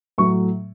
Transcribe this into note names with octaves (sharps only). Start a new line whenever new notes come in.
A2 F#3 A3 C#6